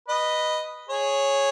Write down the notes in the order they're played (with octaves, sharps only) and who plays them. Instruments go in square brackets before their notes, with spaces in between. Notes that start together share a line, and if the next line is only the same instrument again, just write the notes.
[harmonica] B4 D#5
G#4 C#5